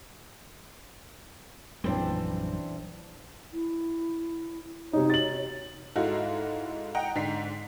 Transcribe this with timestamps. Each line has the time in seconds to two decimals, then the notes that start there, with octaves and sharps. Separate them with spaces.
1.84 A#1 F#2 E3 G3 C4 D4
3.53 E4
4.93 C3 D#4 C#5
5.10 A6 F#7
5.96 G#2 G#3 E4 F#4 A4 F5
6.95 D#5 F#5 G5 A#5
7.15 G#2 D3 B6 C7